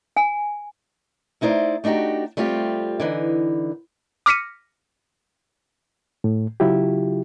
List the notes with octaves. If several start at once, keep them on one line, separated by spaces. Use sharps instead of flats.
G#5
A3 D#4 E4 C5 D5
A3 D4 D#4 F#4 G4
G3 A3 C4 F4 G4
D3 E3 D#4
D6 F6 A#6 B6 C#7 D#7
A2
C#3 F#3 E4 F4 G4